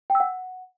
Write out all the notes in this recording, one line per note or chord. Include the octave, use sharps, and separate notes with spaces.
G5
E6
F#5